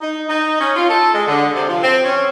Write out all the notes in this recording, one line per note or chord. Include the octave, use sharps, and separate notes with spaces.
D#4
D#4
C#4
F4
A4
G#3
D3
C3
F3
C4
C#4